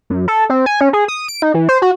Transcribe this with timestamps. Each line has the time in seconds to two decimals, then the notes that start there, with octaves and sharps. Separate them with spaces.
0.10 F#2
0.28 A4
0.50 C4
0.66 G#5
0.81 C#4
0.93 G#4
1.08 D#6
1.28 D7
1.42 D#4
1.54 E3
1.69 C5
1.82 F#4